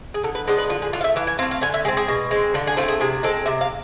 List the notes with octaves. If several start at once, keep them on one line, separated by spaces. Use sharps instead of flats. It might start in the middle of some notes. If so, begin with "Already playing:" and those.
G#4
D3 A4
B4
G#3 B3 D4 C5
B4
D3 F4
G#4
A3 D4 F4
F5
E5
E3 F5
G#5
A3 C4 F5
F5
D3 G#5
E5
G#3 C4 G#4
G#4
B2
G#3 C4
D3 F4
G#4
A3 C4 F4
G#4
C3 G#4
G#3 C4 A4
C3 E5
F5